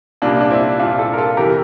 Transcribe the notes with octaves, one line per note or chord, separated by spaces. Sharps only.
C2 A#2 A#3 D4
D4
C4 E4
C2 A#2 D4 F4
F4 A4
A#4
F4 A4
F2 C3 E3 G4 A#4